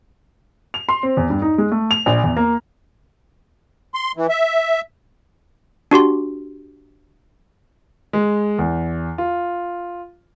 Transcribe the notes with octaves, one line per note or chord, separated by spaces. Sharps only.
F7
C6
C4
E2
G2
D#4
G#3
A3
F7
A#1
E2
A#3
C6
E3
E5
D4 F#4 G4 C6
G#3
E2
F4